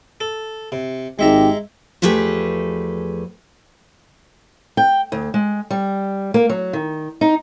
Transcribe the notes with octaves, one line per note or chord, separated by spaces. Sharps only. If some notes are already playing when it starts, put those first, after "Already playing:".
A4
C3
G#1 G#2 G#3 G4 E5 A#5
E2 F3 A3 G4 G#4 B4
G5
D2
G#3
G3
A#3
F#3
D#3
D#4